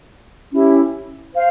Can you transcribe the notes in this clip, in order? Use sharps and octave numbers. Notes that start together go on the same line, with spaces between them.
C#4 E4 G4
C5 F5